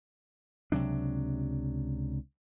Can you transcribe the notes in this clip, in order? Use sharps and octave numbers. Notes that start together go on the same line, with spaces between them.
C#2 C3 F#3 D4